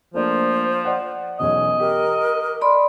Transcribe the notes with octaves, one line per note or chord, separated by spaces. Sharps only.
F3 A3 A#3 D4 C5
D5 F#5
B1 E2 B2 C#4 D#5
G4 A#4
D5 B5 C6